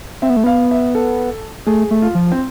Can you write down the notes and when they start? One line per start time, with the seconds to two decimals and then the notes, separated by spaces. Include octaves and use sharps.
0.22 C4 E5
0.30 B3
0.37 A3
0.44 B3 F5
0.71 E5
0.95 A4
1.67 A3 G#4
1.91 A3
2.02 F4
2.15 F3
2.32 C4